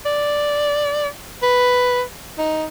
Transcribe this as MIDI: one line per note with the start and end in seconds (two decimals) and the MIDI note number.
0.05 1.08 74
1.42 2.02 71
2.38 2.66 63